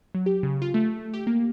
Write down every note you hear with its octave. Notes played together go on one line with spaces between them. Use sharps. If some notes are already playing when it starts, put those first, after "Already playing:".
F#3
G4
C#3
F4
A3
G4
A#3